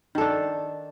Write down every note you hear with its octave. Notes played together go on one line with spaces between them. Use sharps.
D#3 D4 A4